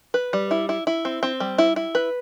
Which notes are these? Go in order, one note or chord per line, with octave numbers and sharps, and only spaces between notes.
B4
G3
E4
E4
E4
C4
C4
G3
E4
E4
B4